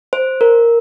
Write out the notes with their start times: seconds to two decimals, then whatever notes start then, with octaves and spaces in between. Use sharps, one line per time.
0.13 C5
0.41 A#4